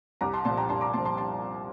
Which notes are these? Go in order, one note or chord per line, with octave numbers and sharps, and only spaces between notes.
C2 A#5 D6
A5 C6
A#2 F3 A5 C6
G5 A#5
C2 A5 C6
A#5 D6
A#2 F3 A5 C6
A5 C6
A5 C6